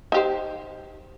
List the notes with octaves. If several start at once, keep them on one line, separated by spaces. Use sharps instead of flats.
D#4 G4 C5